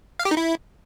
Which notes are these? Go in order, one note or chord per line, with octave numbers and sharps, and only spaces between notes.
F5
G4
D#4
E4